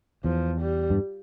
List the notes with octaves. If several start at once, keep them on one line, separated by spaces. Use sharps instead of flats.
E2 F3
G3
G2